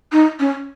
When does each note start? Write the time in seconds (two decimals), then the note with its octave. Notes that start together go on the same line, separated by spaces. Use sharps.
0.12 D#4
0.40 C#4